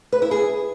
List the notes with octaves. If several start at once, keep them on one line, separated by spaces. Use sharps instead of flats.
B4
E4
G#4